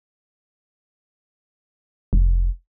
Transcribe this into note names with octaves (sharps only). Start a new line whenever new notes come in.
F1